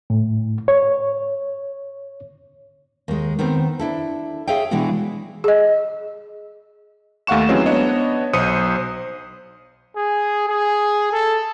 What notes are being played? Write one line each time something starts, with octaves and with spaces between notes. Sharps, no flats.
A2
C#5
D#2 G#3
D#3 B3 C4 C5
D4 E4 A4
G#4 C#5 E5 F5 G5
B2 E3 G#3 D4 E4 F#4
G#4 D#5
D#2 A3 F5 F#5 C#6 E7
E3 F#3 G#3 C4 C#4
B3 D4 C#5 D#5
B1 C5 D#6 C#7 D#7
G#4
G#4
A4